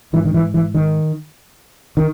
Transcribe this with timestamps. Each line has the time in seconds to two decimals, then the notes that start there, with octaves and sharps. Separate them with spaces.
0.13 G#2 E3
0.25 D#3
0.34 E3
0.54 E3
0.74 D#3
1.97 D#3